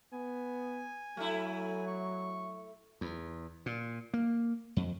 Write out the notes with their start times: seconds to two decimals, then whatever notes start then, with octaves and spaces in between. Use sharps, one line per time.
0.12 B3 G#5
1.17 F#3 A3 E4
1.87 C#6
3.01 E2
3.66 A#2
4.14 A#3
4.76 F2